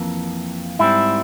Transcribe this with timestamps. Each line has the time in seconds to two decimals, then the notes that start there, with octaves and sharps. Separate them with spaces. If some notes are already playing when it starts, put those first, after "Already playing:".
Already playing: F2 E3 A#3
0.79 G#2 G3 C4 E4